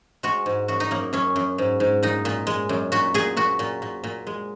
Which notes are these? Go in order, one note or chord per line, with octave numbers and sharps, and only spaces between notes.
G#3 F#4
G#2
F#2 F#4
D#4
F#2 A#3
F#2 C#4
F#2
G#2
G#2
A#2 D#4
A#2
G#3
F#2
A#2 F#4
A#2 G#4
A#2 F#4
A#2
A#2
A#2
G#3